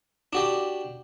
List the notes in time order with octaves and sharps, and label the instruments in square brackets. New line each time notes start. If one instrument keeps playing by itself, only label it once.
[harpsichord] D4 F#4 G4